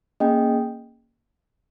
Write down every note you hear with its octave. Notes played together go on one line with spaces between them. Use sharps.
A#3 C#4 G#4 D#5 G5